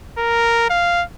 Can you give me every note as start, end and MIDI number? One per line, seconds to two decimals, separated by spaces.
0.18 0.70 70
0.70 1.04 77